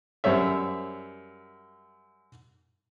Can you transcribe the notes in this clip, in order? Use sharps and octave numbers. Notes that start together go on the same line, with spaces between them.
F#2 G3 C5 C#5 E5